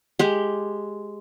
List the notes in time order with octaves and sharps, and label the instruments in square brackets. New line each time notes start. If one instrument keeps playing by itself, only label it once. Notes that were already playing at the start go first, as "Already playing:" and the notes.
[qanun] G#3 G4